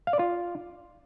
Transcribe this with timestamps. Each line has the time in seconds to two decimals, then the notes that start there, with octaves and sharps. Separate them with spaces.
0.07 F5
0.13 D5
0.19 F4